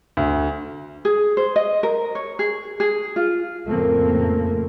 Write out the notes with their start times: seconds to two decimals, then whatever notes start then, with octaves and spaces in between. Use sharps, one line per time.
0.17 D2
1.05 G#4
1.37 C5
1.56 D#5
1.83 A#4
2.15 C#5
2.39 G#4
2.80 G#4
3.16 F4
3.66 F2 A2 C#3 A3 A#3 C4